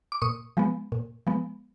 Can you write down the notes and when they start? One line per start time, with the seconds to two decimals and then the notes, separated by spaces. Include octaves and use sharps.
0.12 D6
0.22 A#2 C#6 D#6
0.57 F3 G#3 B3
0.92 A#2
1.27 F3 G#3 B3